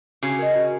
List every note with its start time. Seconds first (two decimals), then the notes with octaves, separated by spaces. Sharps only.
0.23 C#3 C#4 F#4
0.39 A#4 D#5
0.55 F#4